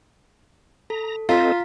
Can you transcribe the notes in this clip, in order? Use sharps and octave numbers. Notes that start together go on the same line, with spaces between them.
A4 A#5
C4 F4 A4 D#5 F5 A#5 B6